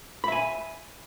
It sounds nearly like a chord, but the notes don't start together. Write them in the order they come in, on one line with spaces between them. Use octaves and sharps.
B5 E5 G#5